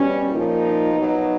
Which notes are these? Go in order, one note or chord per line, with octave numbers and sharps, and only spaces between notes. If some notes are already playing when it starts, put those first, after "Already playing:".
Already playing: B2 G3 C#4
A#2 F3 D#4
B2 F#3